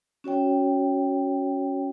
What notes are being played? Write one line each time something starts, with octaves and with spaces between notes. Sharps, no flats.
C#4 F#4 C#5 G5